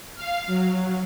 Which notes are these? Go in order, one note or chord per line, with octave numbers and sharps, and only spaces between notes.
F5
F#3